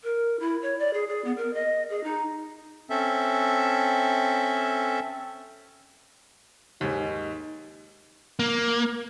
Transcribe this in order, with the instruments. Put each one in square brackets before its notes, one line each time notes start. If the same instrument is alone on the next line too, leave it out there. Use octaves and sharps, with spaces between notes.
[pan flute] A#4
E4
C#5
D5
G#4
G#4
B3
A#4
D#5
G#4
D#4
[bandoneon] C4 C#4 A4 E5
[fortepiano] D#2 G#2 [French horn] D#4
[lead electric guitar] A#3